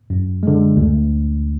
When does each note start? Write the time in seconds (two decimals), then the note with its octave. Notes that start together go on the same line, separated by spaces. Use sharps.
0.10 F#2
0.43 D3 G#3
0.76 D2